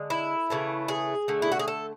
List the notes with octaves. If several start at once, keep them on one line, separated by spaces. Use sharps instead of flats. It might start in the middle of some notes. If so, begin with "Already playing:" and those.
Already playing: D3 G#3
E4
C#3 E3 A3
G#4
D3 A3
E4
F#4
G#4
A4